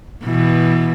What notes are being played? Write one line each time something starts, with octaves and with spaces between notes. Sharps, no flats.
B2 E3